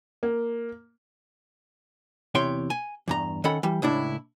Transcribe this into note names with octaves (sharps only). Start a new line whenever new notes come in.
A#3
E2 C3 E4 C#5 G5 C6
G#5
E2 G2 A#5
D#3 C#4 A4 F#5 B5
E3 G3
C#2 A2 D4 E4